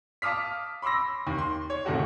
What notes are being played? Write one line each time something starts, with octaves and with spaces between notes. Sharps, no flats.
F5 A5 D6 D#6 F6 B6
B5 C6 D6 E6 A#6
D#2
C6
C#5
D1 D#3 A3 F#4 G4